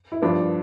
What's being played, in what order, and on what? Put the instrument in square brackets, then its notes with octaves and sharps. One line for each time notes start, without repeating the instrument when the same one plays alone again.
[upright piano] E4
G2 F3 B3 D4